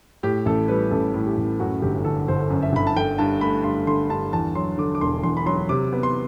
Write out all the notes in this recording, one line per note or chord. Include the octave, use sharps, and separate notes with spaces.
A2 G4
A1 A4
G3 B4
A1 A4
A2
G4
A1
F#2 F#4
G1 G4
D3 A4
G1 C5
F#2
E5
G1 B5
A5
D3 G5
G2 A5
A3 B5
G2 C6
D3 C6
G2 A5
E2 A5
F#3 C6
D3 D6
D6
E1 C6
E2 C6
B5
F#3 C6
C3 D6
B3
C6